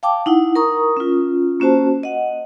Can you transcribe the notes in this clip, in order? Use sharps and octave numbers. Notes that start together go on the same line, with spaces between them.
F5 G5 A5 D6
D#4 E4 F#5
A#4 A#5 C#6 D#6
C#4 F4
A#3 C#4 F#4 C5 A5
D#5 F#5